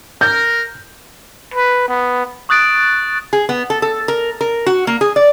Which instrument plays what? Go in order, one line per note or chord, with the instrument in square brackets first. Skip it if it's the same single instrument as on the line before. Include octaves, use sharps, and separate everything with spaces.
[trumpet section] A#4 [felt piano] G6
[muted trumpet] B4
B3
[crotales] C#6 D#6 F#6 A6 D7
[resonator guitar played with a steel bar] G#4
B3
A4
A4
A#4
A#4
F#4
A#3
G#4
D5